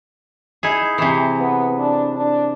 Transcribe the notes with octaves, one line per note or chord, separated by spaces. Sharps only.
D#4 E4 G#4
C3 E3
B3
D4
D4